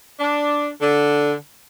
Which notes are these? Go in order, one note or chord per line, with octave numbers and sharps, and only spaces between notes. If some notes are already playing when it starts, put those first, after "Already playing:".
D4
D3